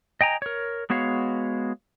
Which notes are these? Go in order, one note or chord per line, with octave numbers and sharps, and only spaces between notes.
D#5 G5 G#5 A#5
A#4 C#5
G#3 B3 F#4 C#5 F5